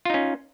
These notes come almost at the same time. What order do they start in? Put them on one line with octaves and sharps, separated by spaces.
F4 D#4 C#4